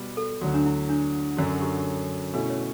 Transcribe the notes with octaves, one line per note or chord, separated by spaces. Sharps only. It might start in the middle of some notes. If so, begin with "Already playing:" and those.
Already playing: B2 G3 B3
A4
D2 D3 F#3 F#4
D4
E4
D4
F#2 D3 F#3 F#4
G4
B2 A3 C#4 E4 B4
C#5